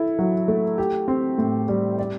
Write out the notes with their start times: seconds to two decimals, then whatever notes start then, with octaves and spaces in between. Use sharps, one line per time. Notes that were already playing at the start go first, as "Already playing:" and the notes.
Already playing: E4 A4
0.19 F#3
0.48 A3
0.78 G4
1.08 C4
1.38 A2
1.68 G3
1.98 D5